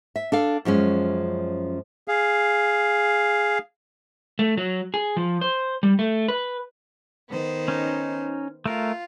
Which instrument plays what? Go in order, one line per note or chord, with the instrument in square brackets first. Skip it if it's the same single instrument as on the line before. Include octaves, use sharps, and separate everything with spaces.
[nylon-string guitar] E5
D4 A4 F5
F#2 F3 G#3 C#4
[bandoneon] G#4 F5
[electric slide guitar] A3
F#3
G#4
F3
C5
G3
A3
B4
[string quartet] D#3 B3 C5
[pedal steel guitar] C#4 D#4
[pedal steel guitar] A3 A#4 [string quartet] F4